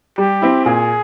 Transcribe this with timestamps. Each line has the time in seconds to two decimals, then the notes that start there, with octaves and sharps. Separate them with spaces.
0.18 G3 G4
0.42 C4 E4
0.65 A#2 G#4